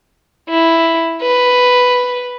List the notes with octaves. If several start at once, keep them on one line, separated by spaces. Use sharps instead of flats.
E4
B4